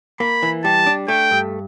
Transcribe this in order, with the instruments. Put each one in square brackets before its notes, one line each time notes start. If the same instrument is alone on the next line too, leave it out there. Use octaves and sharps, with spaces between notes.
[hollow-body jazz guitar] A#3 [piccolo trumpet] B5
[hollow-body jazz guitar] E3
[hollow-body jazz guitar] G3 [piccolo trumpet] A5
[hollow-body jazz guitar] D4
[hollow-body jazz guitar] A3 [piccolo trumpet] G5
[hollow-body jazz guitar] G2